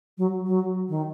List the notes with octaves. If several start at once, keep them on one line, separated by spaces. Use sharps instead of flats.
F#3
F#3
D#3